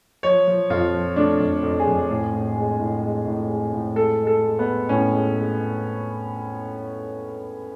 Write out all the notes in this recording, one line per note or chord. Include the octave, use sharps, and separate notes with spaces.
F3 C#5
F3
F2 F4
F3
A3 D4
F2
F2
G#4
F2
A2
A2
G#3
A2
G#3
A2
G#3
A2
G#3 A4
G#3
A4
G#3
B3
G#3
A2 C#4
G#3
G#3